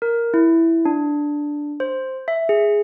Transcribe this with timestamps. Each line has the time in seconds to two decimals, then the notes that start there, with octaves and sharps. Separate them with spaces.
0.02 A#4
0.34 E4
0.85 D4
1.80 C5
2.28 E5
2.49 G#4